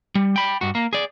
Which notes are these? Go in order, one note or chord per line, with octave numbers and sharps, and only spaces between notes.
G3
G5 B5
G2 F#4
A#3
G#4 D5